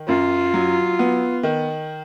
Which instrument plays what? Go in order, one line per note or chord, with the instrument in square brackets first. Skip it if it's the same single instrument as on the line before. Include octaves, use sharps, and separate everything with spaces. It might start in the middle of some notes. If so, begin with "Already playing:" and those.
Already playing: [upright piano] D#3
[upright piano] F#2 [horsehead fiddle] F4
[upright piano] F#3
B3
D#3